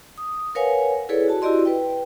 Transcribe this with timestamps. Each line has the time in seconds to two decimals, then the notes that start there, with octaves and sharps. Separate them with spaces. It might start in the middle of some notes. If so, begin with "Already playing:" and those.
0.18 D#6
0.55 A#4 B4 C#5 F5 F#5 G#5
1.09 E4 G#4 A4 B4 C#5 D5
1.28 F#4 A5
1.42 E4 F#4 G4 D5 D#5 C6
1.65 B4 G5